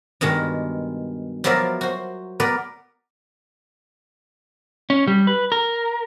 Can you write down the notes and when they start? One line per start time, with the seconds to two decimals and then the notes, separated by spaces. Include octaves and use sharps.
0.21 G2 B2 D#3 G#3
1.44 F3 F#3 B3 A#4 D5 E5
1.81 F#4 C5
2.40 B3 A#4 B4 D5
4.90 C#4
5.07 G3
5.27 B4
5.52 A#4